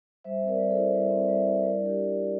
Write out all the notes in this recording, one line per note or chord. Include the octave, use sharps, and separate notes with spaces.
G3 C5 E5
C4
A#4 D5
G3 D5
A4 C5
E4
G3 C5 E5
C4
D5
G3 C5 E5
E4
G3 A#4 D5
D4
G4 A#4
G3
G4
F4